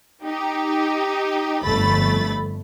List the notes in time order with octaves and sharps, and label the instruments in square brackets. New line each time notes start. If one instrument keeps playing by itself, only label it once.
[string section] D#4 G4
G1 F2 A3 B5 A6